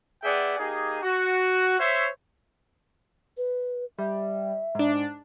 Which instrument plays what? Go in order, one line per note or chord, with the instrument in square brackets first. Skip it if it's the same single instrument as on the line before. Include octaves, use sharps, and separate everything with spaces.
[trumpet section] B3 G#4 D5 E5 F#5 G5
A#3 D#4 G4 G#4
F#4
C5 C#5 E5
[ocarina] B4
[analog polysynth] G3 [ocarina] E5
[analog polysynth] G#2 D4